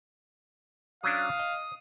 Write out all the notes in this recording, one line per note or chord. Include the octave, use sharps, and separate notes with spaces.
F#3 C#4 D4 F5 D#6
D#5